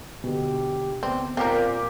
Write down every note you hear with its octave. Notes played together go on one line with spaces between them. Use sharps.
B2 D3 G4
D2 B3 C4 D5
A#2 A#3 C4 G4 A#4 G5